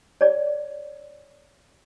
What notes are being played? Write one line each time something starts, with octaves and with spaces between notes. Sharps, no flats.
C#5 D5